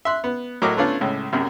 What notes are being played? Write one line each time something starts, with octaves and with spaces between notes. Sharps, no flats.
E5 C6 F#6
B3
A2 F#3 A#4 D#5 D6
A3 B3 C#4 D4 F4 F5
C#2 A2
A#1 F#2 C3